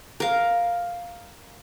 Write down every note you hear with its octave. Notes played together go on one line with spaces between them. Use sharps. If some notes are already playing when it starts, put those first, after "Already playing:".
A#4 F5